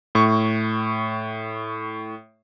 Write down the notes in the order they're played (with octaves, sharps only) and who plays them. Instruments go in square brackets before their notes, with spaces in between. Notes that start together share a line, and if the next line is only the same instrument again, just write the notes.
[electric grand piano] A2 C#6